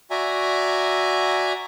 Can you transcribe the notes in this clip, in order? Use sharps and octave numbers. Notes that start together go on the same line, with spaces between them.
F#4 D5 E5 G#5 A#5